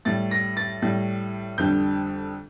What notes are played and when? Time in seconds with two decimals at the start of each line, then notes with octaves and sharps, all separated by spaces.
0.05 A2 G3 A6
0.31 A#6
0.57 A6
0.82 A2 G3
1.58 F2 D3 G3 G6